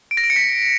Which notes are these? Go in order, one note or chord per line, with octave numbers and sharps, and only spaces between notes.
D7
A#6
D7
C#7
B6